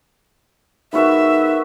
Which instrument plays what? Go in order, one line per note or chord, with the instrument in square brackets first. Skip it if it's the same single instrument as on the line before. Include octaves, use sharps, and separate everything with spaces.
[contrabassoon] G#2 [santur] B3 F#4 A#4 [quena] E5